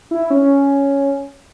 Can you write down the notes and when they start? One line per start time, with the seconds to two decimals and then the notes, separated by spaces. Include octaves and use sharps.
0.11 E4
0.30 C#4